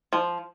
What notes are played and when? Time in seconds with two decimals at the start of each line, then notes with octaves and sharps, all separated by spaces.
0.13 F3